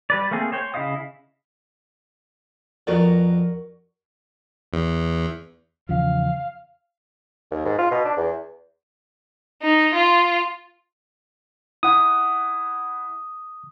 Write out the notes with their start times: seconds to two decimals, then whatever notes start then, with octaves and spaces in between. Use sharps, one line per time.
0.10 G3 B4 D5
0.31 A3 A#3 C4 G#4
0.52 C5 C#5 G5
0.74 C#3 E4 D#5 F5 D#6
2.87 F2 B3 F#4 A#4 D5
4.73 E2
5.89 E2 C#3 F3 F5
7.51 D#2
7.65 G#2
7.79 F4
7.91 B2
8.05 D4
8.17 E2
9.62 D#4
9.94 F4
11.83 E4 F#5 D#6